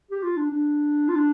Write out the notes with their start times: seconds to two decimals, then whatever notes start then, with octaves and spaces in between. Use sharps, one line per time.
0.11 G4
0.23 F4
0.37 D4
0.50 D4
1.09 F4
1.15 D4